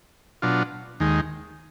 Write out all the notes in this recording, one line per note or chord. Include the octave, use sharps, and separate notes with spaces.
B2 F#3 D4 F4
D#2 D#3 G#3